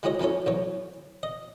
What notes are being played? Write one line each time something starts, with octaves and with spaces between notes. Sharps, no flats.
G#3 E4 F#4 G#4 C#5 D#5
F2 C#4 E4 A4 C#5
B1 E2 C#5
D#5